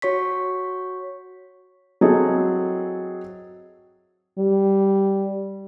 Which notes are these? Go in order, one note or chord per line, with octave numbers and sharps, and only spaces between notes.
F#4 C#5 C#6 B6
F#3 C4 E4 G#4 A4 D#5
G3